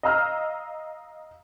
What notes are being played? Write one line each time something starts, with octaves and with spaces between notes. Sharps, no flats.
D#5 F5 A#5 E6 F6